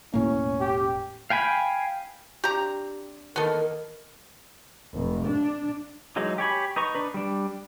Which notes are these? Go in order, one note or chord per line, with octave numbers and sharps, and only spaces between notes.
E1 A2 A#3 C#4
G4
F5 G5 G#5 B5
C4 D4 G4 A#5
D#3 E3 A#3 B3 A4 A#4
F1
D4
E3 F#3 G#3 D#4
G4 C#5 G#5 B5
D#4 B4 A#5 C#6
D4 B4
G3 D4